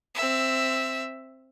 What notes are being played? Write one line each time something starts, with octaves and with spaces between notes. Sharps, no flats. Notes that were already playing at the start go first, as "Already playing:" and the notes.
C4 E5